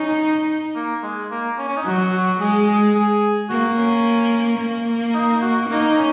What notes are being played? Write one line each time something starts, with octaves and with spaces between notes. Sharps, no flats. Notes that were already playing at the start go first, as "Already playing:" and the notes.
Already playing: C#4 D#4
A#3
G#3
A#3
C#4
C#4
D#4
F#3 F#4
F#4
G#3 G#4
G#4
G#4
A#3 F#4
C#4
A#3
D#4
F#4
A#3 D#4
C#4